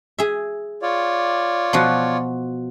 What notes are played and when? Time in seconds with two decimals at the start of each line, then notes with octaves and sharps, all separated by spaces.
0.18 G#4 E5
0.82 F4 C#5 D5
1.73 B2 F3 F#4